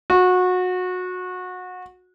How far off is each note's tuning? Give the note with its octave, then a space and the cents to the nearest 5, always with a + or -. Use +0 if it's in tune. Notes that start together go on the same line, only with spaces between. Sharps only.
F#4 -25